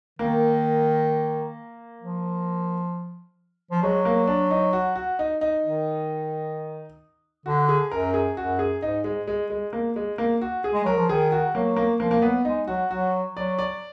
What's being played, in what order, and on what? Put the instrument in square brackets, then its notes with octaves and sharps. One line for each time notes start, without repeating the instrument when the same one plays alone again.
[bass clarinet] D#3 [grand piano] A#3
[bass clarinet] F3
F3
[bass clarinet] F#3 [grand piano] G#3
[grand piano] A#3
D4
D#4
F#4
F#4
D#4
D#4
[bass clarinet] D#3
[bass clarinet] D3 [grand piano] F#4
[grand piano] G#4
[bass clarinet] F#2 [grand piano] A#4
[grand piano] G#4
[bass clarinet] F#2 [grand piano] F#4
[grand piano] G#4
[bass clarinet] G#2 [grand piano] D#4
[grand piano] G#3
G#3
G#3
A#3
G#3
A#3
F#4
G#4
[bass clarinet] G#3
[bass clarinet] F#3 [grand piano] A#4
[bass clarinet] F3
[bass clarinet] D#3 [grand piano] G#4
[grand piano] F#4
[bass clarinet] F#3 [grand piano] A#3
[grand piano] A#3
[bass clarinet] F3 [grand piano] A#3
[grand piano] A#3
[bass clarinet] F#3 [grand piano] B3
[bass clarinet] G#3 [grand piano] D#4
[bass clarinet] F#3 [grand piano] F#4
[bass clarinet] F#3 [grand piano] F#4
[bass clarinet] F#3 [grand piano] D5
[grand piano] D5